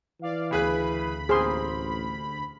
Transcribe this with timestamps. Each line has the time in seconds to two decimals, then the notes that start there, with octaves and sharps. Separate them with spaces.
0.22 E3 D5 F5
0.51 D2 C#3 G#4 B4 B5
1.29 A1 A#3 C4 G#4 C6